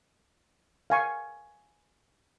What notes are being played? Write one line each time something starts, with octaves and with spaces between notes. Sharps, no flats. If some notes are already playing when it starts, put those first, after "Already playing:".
F5 G#5 C#6